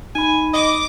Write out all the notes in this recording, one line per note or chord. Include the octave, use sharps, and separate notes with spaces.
D#4 G#5 B5
D#5 D6